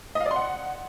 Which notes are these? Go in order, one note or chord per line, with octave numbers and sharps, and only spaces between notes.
D#5
F5
D5
C6
F#5